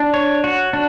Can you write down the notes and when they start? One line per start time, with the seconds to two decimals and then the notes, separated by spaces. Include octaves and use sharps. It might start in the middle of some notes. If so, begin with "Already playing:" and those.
Already playing: D4
0.14 C#5
0.44 F#4
0.73 D4